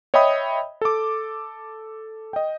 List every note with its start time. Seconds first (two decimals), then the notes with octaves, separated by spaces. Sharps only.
0.14 C#5 D#5 E5 G5 B5 D#6
0.81 A4 D6
2.33 D#5 G5